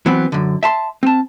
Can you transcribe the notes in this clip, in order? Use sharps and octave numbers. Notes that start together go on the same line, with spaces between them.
E3 F#3 B3 C4
F#2 D3
E5 A5 C6
C4 A5